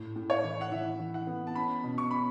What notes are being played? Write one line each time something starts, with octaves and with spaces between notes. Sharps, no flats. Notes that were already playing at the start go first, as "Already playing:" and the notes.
Already playing: A2
A2
C#5
E3
F#5
E3 E5
E3
F#5
B3
A5
C#4 B5
B2
C#6
C#4 B5